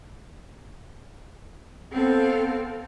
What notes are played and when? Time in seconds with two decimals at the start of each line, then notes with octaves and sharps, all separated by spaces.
1.91 B3 C4 A4 F5